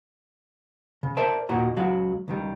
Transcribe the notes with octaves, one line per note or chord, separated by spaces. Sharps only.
C#3
A#4 C5 D5 E5 A5
D#2 A#2 D#3 F#4 A#5
C#2 F#3 F#4 F5
C#2 D#3 G3